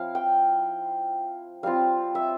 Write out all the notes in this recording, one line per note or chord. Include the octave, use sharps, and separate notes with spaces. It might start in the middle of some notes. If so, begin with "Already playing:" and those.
Already playing: F3 C4 E4 F5
G5
G3 C4 F4 F5
E5